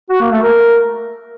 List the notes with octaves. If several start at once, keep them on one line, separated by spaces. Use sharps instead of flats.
F#4
A#3
A3
A#4